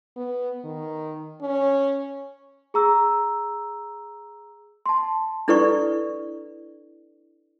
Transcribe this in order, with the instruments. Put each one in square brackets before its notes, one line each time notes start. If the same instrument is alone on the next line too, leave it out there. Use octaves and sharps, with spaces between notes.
[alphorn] B3
D#3
C#4
[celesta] G#4 A#5 E6
A5 C6
[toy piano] D4 E4 A4 B4 D5 C#6